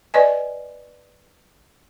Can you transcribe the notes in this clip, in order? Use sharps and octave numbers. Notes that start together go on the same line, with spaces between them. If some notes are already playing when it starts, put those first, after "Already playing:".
B4 D5 D#5 G#5